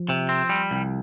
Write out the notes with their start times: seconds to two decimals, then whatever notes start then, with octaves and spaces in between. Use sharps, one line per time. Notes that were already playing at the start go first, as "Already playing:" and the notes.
Already playing: F3
0.09 C3
0.29 C4
0.49 G3
0.71 C2